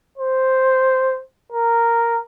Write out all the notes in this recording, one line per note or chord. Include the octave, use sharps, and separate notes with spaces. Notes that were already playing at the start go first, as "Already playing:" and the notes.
C5
A#4